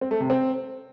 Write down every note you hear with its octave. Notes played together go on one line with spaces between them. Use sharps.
C4
A3
C3
C4